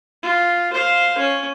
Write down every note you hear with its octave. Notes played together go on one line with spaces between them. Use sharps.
F4
C5 F5
C#4